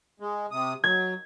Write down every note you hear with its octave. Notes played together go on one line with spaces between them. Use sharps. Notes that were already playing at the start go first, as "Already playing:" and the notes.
G#3
C3 D#6
F#3 G#6